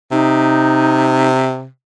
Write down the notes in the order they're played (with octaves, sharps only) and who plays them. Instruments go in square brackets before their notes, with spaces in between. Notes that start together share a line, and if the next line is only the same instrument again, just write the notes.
[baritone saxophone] C3 [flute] D#4